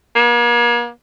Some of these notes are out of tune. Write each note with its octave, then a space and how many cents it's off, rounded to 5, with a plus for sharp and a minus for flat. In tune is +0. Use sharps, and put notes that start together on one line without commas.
A#3 +40